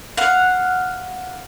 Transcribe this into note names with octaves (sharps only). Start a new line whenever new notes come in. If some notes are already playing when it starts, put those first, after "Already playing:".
F5 F#5